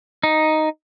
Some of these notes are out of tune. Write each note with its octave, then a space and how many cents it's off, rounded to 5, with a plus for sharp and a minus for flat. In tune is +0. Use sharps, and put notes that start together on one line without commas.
D#4 +0